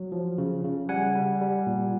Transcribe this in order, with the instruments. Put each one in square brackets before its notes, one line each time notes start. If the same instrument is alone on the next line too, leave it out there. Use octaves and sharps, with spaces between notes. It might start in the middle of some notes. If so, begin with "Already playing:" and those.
Already playing: [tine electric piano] F#3
F3
C#3
C#3
G3 F#5 G#5
G3
G3
A#2